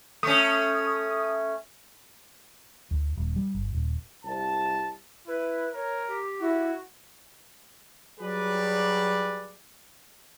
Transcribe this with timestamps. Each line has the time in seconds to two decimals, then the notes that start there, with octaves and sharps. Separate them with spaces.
0.23 A3 C#4 D#6
2.91 D2
3.17 D#1
3.36 G3
3.54 G1
3.73 D#1
4.25 C2 A5
5.28 E4 B4
5.74 A#4 C#5
6.08 G4
6.40 E4 F#4
8.20 F#3 G3 G#4 B4 D5